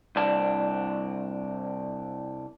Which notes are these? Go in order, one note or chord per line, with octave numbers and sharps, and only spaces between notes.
C2 D4